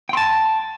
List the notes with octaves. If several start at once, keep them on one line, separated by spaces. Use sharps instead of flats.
G5 A5 C6